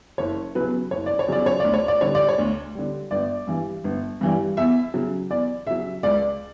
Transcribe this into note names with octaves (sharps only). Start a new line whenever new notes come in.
F#1 C#5
E2 C#3 F#3 B4
F#1 C#5
D5
C#5
E2 C#3 F#3 D5
C#5
D2 D5
C#5
D5
D3 G3 C#5
D5
C#5
D2
D3 G3
G1 D5
G2 E3 G3
G1
G2 E3 G3
E2 E5
C#3 F#3
E2 D5
C#3 F#3 E5
C#2 D5